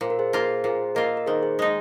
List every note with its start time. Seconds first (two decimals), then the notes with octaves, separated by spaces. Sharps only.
0.01 A#2 C5
0.10 A#4
0.19 G#4 C5
0.33 A#3 F4 G#4 C5
0.64 A#2 G#4 C5
0.95 A#3 F4 A#4 D#5
1.17 A#4
1.27 D#3 G#4 C5
1.43 G#4
1.59 G#3 D#4